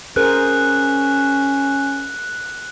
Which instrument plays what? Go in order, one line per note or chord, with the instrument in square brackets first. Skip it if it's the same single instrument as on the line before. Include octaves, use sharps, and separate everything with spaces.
[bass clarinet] C#4 [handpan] G#4 A#4 C5 [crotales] F#6